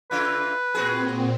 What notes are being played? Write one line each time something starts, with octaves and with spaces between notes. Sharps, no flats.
C#3 E4 F4 B4
A#2 B3 C4 F#4 G#4